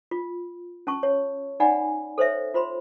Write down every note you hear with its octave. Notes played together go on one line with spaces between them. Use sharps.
F4
C#4 A5 C#6
C#5
D#4 D5 F#5 G#5 B5
A4 C5 C#5 E5
F4 C5 B5 C6